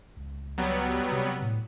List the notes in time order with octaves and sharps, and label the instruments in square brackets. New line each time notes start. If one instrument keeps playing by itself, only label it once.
[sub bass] C#2
[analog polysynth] F#3 G3 B3
[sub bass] C3
A2